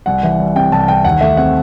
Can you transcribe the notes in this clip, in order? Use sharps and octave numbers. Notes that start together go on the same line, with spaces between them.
C2 F#5
E3
C2
C3 G5
C2 A5
E3 G5
D#2 F#5
A3 E5
C4 F#5